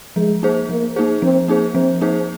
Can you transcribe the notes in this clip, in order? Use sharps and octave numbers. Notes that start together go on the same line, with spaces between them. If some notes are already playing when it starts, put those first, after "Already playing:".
F3 G#3
A#3 D#4 G#4 C5
F3 A#3
A#3 D#4 G#4 C5
F3 C4
A#3 D#4 G#4 C5
F3 C4
A#3 D#4 G#4 C5